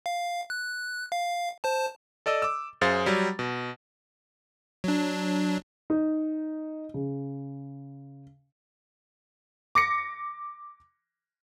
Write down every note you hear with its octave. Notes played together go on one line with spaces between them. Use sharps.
F5
F#6
F5
C5 A5
A4 D5 D#5 E6
D6 E6
F#2 G#4 C5 F5 A6
F#3 G3
B2
F#3 D4
D#4
C#3
D6 A#6 C#7